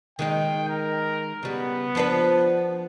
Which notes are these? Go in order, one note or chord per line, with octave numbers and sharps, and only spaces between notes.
D#3 G#3 D#4 G5
A#4
C#3 G3 B3
F3 D4 B4